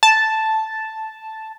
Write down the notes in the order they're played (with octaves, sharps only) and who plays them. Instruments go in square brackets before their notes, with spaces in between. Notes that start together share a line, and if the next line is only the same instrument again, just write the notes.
[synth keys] A5